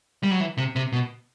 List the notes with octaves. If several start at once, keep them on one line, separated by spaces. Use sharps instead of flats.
G3
F#3
E3
C3
C3
B2